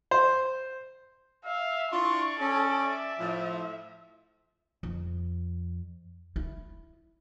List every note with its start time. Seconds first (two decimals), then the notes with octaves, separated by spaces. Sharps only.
0.11 C5
1.45 E5 F5
1.92 D4 E4 F4 D5 C#6
2.40 C#4 A4
2.83 E5
3.19 A2 F3
4.83 F2
6.36 E4